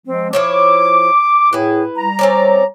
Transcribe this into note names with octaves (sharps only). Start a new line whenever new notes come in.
F3 G#3 C4
F3 E4 C#5 D6
A2 E4 G#4 B4
G3 A#5
C4 C#4 D5